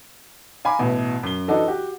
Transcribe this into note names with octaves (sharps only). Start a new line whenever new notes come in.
F5 G#5 A#5 B5 D6
A1 B2 E4 F#4
F#2 G7
E3 D4 D#4 F#4 A4
F#4 G4